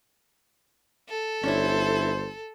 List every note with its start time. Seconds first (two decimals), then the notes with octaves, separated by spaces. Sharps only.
1.09 A4
1.44 G1 C#4 D4 E4 C5